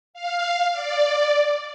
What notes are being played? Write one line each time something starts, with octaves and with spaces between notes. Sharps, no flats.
F5
D5